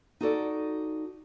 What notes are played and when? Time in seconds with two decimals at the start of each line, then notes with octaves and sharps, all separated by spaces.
0.21 D#4 F#4 A4 D5